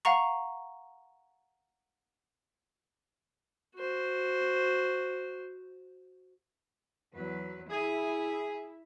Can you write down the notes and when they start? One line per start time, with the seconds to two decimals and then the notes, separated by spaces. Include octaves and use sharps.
0.05 F5 F#5 A#5 C#6
3.76 F#4 C5
7.13 E2 F#3 B4
7.70 E4 G#4 E5